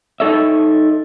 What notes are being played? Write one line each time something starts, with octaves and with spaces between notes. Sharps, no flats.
D#4 A4 C#5 E5